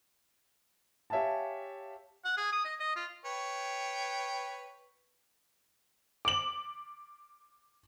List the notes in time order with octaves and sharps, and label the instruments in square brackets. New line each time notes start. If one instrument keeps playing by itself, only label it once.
[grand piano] G4 C#5 E5 F5 G#5 A5
[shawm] F#5
G#4
D#6
D#5
D#5
F4
[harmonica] B4 C#5 G5
[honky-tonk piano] D6 F#7